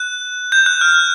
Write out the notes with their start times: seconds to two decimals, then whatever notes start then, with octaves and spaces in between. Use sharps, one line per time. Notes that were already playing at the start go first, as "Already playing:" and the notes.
Already playing: F#6
0.52 G6
0.66 F#6
0.81 F6